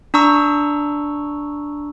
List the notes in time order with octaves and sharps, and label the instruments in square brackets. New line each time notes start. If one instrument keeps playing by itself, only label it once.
[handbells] D4 A#5 C#6 E6